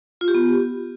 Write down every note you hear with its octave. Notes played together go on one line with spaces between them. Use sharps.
F4
G4
B3